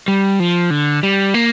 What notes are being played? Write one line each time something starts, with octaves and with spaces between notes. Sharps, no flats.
G3
F3
D3
G3
A#3